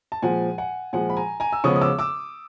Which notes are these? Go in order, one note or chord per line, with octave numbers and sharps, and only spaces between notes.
A5
A#2 F3 G#3 F#5 G#5
F#5 G#5
A#2 F3 G#3 F#5 G#5
B5
G#5 A#5
G#5 A#5
E6
C#3 F3 G#3 B3 C#6 D#6
D#6
D6 E6
D6 E6